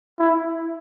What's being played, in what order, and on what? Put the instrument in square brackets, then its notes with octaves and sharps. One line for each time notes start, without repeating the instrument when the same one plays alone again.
[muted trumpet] E4